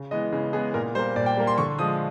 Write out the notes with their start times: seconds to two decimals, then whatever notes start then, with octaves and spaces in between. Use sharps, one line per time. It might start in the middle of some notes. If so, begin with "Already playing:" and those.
Already playing: C#3
0.11 E3 G#3 B3 D#5
0.32 C#3
0.53 E3 G#3 B3 G#4
0.74 A#2 A#4
0.95 G3 A#3 C5
1.16 A#2 D5
1.26 G5
1.37 G3 A#3
1.47 C6
1.58 D3 C#6
1.78 F3 G#3 D#6